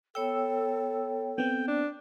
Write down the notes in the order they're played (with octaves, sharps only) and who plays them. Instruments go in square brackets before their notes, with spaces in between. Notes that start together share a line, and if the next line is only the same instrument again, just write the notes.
[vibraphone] B3 C#5 G5 [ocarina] A4 [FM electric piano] E6
[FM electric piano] B3 C4 [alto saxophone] G5
[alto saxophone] D4